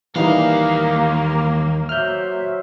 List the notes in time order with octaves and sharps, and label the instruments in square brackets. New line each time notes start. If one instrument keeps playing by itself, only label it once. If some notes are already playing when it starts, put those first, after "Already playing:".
[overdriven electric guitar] D#2 F5 [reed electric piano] E3 G3 D#4 [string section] A#3
[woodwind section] F#3 C5 E5 [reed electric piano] F6 G6